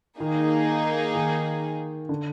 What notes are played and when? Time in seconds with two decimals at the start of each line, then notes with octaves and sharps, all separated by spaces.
0.20 D#3 A#3 D#4 G#4
1.15 D#3
2.09 D3